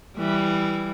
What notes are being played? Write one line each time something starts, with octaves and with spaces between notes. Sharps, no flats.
E3 G3